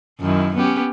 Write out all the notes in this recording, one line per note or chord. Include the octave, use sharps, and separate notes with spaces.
F#2 D#3 E4
B3 C#4 G4